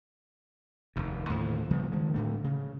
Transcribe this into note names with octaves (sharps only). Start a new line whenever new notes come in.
F1 D#2
D#2 A2 D3 F3
C#3 F3 G3 B3
D#3 G#3
A2 D3 A3
C#3